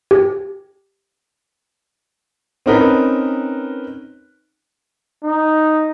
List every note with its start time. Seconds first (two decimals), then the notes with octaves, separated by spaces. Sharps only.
0.11 G4
2.66 C4 C#4 D#4 A#4 B4
5.23 D#4